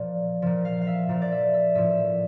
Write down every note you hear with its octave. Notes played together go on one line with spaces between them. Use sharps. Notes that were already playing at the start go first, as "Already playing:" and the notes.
Already playing: A#2 F3 D5
A#2 F3
F5
F5
E5
A#2 F3
D5
E5
E5
A2 F3 E5